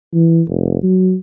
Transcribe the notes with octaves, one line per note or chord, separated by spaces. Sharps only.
E3
F1
F#3